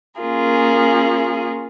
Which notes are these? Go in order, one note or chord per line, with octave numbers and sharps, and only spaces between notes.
A#3 C#4 F4 G#4 A#4